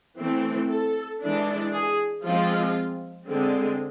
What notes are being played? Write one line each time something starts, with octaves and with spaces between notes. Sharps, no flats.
E3 A3 C4
A4
E3 G#3 D4
G#4
F3 G#3 C4 F4
D3 G#3 C4